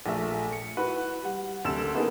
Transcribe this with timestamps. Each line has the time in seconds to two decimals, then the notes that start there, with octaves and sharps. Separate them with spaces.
0.06 A#1 A3 E5
0.53 C#7
0.77 E4 F#4 B4
1.23 G3 F#5
1.64 F#1 D2 C3 A4 E6 E7
1.95 A#3 B3 D#4 E4 G#4 A4